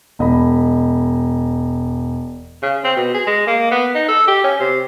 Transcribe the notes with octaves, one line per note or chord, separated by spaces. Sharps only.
E1 D#5 B5
C#3
C4
B2
G#4
G#3
A#3
B3
D#4
A4
G4
C#4
C3